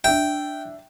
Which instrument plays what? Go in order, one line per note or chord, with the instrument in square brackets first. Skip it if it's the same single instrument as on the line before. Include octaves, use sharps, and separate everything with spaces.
[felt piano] D4 E5 [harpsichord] G5